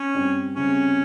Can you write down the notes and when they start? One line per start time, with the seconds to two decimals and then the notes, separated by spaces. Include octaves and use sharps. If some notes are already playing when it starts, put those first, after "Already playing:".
Already playing: C#4
0.14 G2 G3 C4
0.55 C#2 C3 G3 C4 C#4